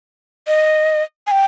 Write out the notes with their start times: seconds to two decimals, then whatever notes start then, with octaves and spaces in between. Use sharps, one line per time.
0.47 D#5
1.27 G#5
1.31 G5